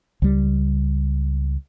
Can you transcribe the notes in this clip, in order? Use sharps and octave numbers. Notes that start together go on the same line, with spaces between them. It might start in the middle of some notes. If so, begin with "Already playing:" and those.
C#2 G3